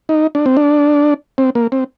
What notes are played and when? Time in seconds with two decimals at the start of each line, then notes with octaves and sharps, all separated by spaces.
0.09 D#4
0.35 D4
0.46 C4
0.57 D4
1.38 C4
1.55 A#3
1.72 C4